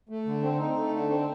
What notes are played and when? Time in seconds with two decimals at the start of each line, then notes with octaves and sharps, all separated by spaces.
0.09 A3
0.26 D3
0.42 C4
0.59 D#4
0.76 A3
0.93 D3
1.10 C4